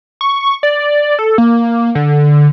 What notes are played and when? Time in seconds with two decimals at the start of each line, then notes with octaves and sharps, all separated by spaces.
0.21 C#6
0.63 D5
1.19 A4
1.38 A#3
1.95 D3